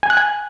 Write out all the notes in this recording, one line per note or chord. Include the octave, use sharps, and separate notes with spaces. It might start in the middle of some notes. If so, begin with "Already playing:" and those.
G#5
F#6
G#5